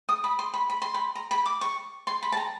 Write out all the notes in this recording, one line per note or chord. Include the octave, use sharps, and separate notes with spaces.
D#6
B5
C6
B5
B5
C6
B5
A#5
B5
D6
C#6
C6
B5
A5
A#5